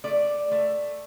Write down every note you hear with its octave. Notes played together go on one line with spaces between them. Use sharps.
A3 D5
A3